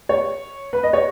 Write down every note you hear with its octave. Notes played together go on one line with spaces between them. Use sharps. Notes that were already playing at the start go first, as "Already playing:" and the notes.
C#5
B4
D#5
C#5